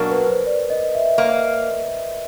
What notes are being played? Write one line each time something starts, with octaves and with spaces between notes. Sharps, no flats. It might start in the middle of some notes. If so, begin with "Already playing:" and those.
Already playing: B2 F#3 A#3 D4 A#4
B4
C5
D5
D#5
E5
A#3